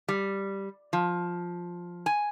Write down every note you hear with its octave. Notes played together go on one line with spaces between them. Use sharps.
G3
F3
G#5